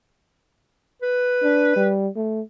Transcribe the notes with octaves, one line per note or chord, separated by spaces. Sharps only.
B4
D4
G3
A3